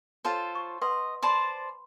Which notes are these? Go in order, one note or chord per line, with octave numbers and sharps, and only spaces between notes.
F4 A4 C5 C#5
C#6
B4 D#5 F#5 C6
C5 D5 A5 B5 C6